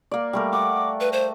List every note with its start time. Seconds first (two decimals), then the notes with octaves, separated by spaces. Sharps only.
0.11 A#3 D5
0.33 G3 A3 A#4
0.53 F#5 D6
1.00 B4
1.12 C5